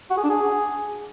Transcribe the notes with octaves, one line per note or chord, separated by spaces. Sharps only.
F#4
G#4
D4
G#4